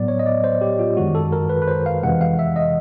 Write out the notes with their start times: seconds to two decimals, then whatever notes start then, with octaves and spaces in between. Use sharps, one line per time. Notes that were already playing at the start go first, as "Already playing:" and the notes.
Already playing: A2 F#3 B3 D5
0.08 C#5
0.19 D#5
0.26 D5
0.44 C5
0.61 G4
0.79 F4
0.97 F#2 D#3 G#3 F#4
1.15 A4
1.32 A#4
1.49 B4
1.62 B4
1.68 C5
1.86 F5
2.03 F2 C3 E3 G#3 F#5
2.21 F5
2.39 E5
2.56 D#5